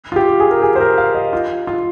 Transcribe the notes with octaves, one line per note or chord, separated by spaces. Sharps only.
F4
G4
G#4
A#4
G#4
C5
A#4
F5
D#5
F4
F4